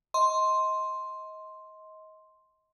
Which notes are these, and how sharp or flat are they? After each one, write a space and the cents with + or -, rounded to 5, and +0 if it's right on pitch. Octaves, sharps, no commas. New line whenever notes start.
D#5 +25 C6 +5